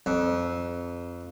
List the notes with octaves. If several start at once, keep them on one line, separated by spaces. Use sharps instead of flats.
F2